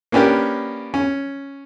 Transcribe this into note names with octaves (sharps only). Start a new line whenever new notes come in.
A#3 B3 C#4 D4 G4 A#4
C#4